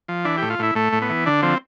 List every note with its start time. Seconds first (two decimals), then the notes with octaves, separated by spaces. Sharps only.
0.08 F3
0.25 E3 D4
0.38 A2 G4
0.50 F4
0.59 A2 E4
0.75 A2 A3
0.93 A2
1.02 B3
1.10 E3
1.26 D3 D4
1.43 F3 C4